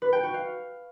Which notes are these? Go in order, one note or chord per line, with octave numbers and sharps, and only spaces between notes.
B4
G5
F#4
F5